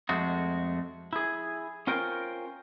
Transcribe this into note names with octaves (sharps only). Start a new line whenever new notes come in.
F2 G#3 A3 F#4
E4 G#4
C#4 F4 A#4 C5 G5